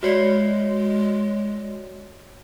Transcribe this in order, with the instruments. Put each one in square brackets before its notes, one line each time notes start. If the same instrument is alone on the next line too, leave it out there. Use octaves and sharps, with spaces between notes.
[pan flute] G#3 [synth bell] F#4 C#5 D5